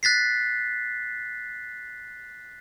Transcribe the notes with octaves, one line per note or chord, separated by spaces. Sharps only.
F#6 A6 B6 C7